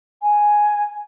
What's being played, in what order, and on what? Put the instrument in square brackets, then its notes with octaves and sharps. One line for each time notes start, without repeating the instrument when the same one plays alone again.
[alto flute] G#5